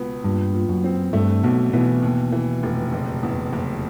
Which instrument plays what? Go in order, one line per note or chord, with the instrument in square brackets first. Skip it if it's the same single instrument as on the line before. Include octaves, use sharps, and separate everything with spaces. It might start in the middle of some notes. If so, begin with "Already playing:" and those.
Already playing: [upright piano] C#2 B2 B3
[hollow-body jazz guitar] G2 [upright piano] A#2
[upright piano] A#2
[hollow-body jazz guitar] F#2
[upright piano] C4
[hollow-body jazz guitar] G2 [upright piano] A3
[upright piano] B1 [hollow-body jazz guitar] B2
[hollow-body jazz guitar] B2 [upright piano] E3
[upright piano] D#2
E3
F1
F#1
E2
F#1